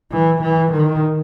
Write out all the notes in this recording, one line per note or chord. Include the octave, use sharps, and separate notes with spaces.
E3
E3
D#3